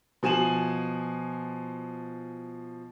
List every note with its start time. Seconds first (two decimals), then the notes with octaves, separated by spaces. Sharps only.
0.23 B2 F3 G#5 E7 F#7